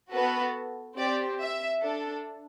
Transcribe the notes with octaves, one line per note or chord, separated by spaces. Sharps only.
B3 F#4 A4 B4
C4 G4 D5
E5
D4 A4